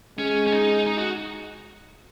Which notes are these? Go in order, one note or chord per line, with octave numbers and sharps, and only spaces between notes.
G#3 C#4
C#4
D#4
D#4
F#4